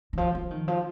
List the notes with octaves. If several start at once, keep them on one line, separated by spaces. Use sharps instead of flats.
D#3
F3
F3
D#3
F3